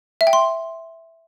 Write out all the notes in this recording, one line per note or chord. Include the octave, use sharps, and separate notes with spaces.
E5
G5
C6